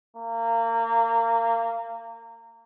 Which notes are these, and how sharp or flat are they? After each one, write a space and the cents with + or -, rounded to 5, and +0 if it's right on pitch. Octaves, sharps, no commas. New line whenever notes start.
A#3 -25